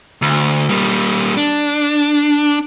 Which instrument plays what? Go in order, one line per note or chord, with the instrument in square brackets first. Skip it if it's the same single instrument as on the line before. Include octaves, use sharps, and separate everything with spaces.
[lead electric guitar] D2
G3 A#3
D4